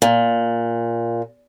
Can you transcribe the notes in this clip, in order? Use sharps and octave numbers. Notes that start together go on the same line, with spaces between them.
A#2